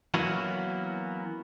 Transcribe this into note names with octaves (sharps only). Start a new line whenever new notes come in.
E3 F#3 A#3 B3 C#4 F#4